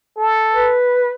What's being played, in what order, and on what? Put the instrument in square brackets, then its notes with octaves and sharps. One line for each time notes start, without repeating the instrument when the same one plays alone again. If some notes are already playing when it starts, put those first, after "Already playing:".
[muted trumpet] A4
[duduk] B4